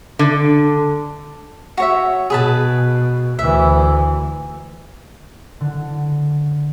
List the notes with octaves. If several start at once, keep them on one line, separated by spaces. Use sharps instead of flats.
D3
F#4 C#5 E5
B2 G#4 B4 A5
D2 E3 E5
D3